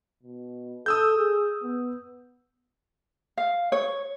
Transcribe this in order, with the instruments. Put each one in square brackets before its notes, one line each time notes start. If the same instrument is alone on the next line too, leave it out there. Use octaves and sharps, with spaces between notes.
[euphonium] B2
[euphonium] A4 [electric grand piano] D#6 E6 G6
[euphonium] G#4
B3
[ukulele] F5
C#5